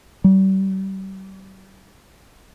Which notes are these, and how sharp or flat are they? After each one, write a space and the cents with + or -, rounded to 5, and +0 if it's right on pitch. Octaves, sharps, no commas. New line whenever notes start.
G3 -35